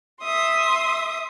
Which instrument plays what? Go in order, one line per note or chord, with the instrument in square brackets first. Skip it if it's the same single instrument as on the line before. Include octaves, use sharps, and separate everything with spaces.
[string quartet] E5 C6 D#6